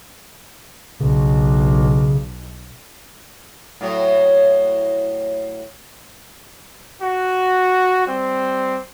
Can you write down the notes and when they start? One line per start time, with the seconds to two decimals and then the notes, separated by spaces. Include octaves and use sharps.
1.00 B1 C#3
3.81 A2 F#3 C#5
7.01 F#4
8.06 G3 C4